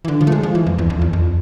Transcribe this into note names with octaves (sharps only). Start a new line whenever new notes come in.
E3
D3
F3
A3
G#3
F3
E3
F2
E2
F2
E2
F2